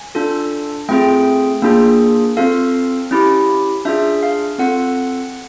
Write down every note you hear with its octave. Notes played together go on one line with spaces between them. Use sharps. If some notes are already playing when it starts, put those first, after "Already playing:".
Already playing: G#5
D4 F4 A4
A3 C4 F4 G#4 G5
A#3 D4 F4 G#4
C4 F4 A4 F5
C#4 E4 G4
D4 F4 G#4 E5
F5
C4 F4 A4 F#5